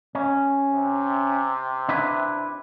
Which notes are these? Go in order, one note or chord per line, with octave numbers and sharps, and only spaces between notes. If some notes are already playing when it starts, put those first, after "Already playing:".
C#4
C3
D4 E4 B4